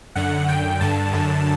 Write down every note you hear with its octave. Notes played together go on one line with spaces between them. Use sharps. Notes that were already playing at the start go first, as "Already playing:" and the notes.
F#2 D3 F#5
F#2 D3 G5
G2 D3 A5
F#2 D3